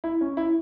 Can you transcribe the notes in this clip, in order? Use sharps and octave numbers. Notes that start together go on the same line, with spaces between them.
E4
C#4
E4